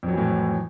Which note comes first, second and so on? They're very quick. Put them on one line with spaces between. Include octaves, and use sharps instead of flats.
F2 F#3 E3 A2